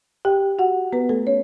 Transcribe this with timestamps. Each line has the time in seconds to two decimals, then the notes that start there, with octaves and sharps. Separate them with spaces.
0.25 G4 G5
0.59 F#4 F#5
0.93 B3 B4
1.09 A3 A4
1.27 C#4 C#5